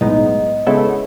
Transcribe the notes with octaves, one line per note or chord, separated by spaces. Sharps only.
B1 A2 G#3 B3 D#4 D#5
C#3 G#3 B3 E4 A4 C#5